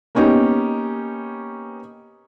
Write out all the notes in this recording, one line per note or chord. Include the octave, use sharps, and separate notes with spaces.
A#3 B3 C#4 D#4 G4